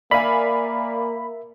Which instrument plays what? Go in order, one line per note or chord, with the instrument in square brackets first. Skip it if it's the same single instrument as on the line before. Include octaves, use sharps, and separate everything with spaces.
[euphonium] A#3 [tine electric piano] A#4 E5 [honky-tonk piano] D5 F5 G#5 [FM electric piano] B5